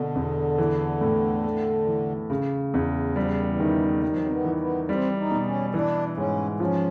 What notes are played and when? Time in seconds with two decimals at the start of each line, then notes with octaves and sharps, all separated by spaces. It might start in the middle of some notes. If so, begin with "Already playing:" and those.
Already playing: B2 D3
0.15 E2
0.58 E3
1.01 A2
1.44 A3
1.87 E3
2.30 C#3
2.74 E2
3.16 F3 G3
3.26 E3
3.35 D#3
3.45 E3
3.60 D#3
4.02 F#3 G3
4.11 F3
4.19 F#3
4.26 C4
4.31 B3
4.45 E3
4.60 B3
4.88 G3 C4
5.17 D#4
5.31 B2
5.46 C#4
5.74 E3 D4
6.17 G#2 C#4
6.60 F3 C#4